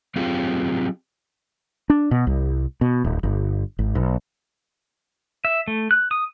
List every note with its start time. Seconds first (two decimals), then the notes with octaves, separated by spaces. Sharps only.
0.16 F#3 C4 F4 G4 G#4 F5
1.90 D4
2.11 B2
2.27 C2
2.81 B2
3.04 D1
3.23 G1
3.79 G#1
3.95 B1
5.45 E5
5.68 A3
5.91 F#6
6.11 D#6